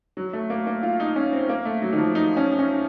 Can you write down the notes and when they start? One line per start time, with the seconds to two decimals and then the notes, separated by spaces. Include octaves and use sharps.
0.17 F#3
0.33 A3
0.50 A#3
0.67 A#3
0.83 F4
1.00 D#4
1.16 C#4
1.33 C4
1.49 A#3
1.65 A3
1.82 F#3
1.93 D#3
1.98 F3
2.15 D#4
2.37 C#4
2.59 C#4